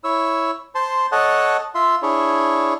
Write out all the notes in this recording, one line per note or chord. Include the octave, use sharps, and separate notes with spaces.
E4 C#5 E6
C5 A5 C6
A4 C#5 D#5 F#5 A5
F4 E5 C6
D4 E4 G#4 C#5